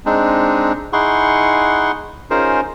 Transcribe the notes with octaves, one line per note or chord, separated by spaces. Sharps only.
G#3 C4 D4 D#4
D#4 E4 G#4 F#5 C6 C#6
C#4 D#4 F4 G#4 A#4 C5